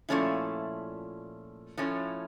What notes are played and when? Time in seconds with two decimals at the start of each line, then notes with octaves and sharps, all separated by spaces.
0.09 A#2 F3 A3 C#4 E4
1.78 A2 F3 A3 C#4